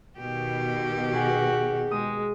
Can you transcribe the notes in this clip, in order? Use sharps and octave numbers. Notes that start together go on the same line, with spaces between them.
B2 D#3 G4
F#4 G#4
G#3 D#6